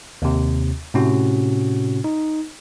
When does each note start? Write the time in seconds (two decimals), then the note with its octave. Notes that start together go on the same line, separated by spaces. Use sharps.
0.22 D#2 C3
0.94 A2 C3 C#4 F#4
2.04 D#4